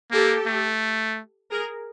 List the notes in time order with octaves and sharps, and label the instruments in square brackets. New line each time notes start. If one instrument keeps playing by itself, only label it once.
[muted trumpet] A#3 [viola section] G4 A4
[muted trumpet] A3
[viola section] G#4 A#4